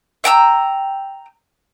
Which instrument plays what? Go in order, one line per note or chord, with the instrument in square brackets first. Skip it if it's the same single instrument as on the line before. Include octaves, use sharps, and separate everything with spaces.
[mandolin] E5 G5 A#5 E6